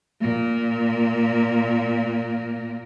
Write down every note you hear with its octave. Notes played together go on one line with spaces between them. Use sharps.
A#2 A#3